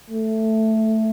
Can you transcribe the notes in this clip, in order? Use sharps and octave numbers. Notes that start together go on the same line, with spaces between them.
A3